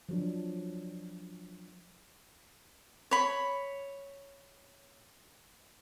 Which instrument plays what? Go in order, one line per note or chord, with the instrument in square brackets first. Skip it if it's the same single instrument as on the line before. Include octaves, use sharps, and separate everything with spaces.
[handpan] F3 F#3 D4
[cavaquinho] C#5 B5